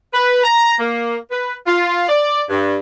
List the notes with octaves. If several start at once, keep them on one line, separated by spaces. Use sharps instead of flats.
B4
A#5
A#3
B4
F4
D5
G2